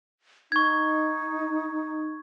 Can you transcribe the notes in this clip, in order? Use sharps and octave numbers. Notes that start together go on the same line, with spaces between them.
D#4 C#6 G#6